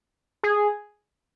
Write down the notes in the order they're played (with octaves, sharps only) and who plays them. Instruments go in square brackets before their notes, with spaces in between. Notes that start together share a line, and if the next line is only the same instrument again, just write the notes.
[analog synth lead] G#4